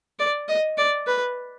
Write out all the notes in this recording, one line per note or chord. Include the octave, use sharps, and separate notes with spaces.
D5
D#5
D5
B4